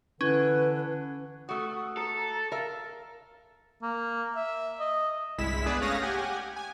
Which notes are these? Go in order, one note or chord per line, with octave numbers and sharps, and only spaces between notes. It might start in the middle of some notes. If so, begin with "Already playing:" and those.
D3 E3 C#4 B4
A3 F#4 D#6
A4 A#5
A#4 E5 F5
A#3
E5
D#5
G1 C2 G#3 E4 B6 E7
B3 D4 G#4 B4 D5
A3 C#4 C#5 F5 D#6 A#6
G4 F#5 G#5
G#5